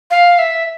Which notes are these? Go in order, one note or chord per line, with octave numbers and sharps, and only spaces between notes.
F5
E5